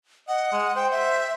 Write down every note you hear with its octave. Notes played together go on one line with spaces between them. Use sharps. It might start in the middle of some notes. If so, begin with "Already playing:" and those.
D#5 F#5
G#3
C5 G5
E5